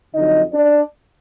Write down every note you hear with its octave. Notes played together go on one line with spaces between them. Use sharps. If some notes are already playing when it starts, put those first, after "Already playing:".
F2 D3 F#3 D#4 D#5
D4 D5